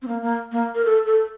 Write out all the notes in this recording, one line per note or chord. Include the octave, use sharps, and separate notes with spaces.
C4
A#3
A#3
A#3
A#4
A4
A4